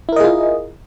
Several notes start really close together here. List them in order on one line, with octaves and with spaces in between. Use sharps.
E4 A#4 D#5 G#4 F4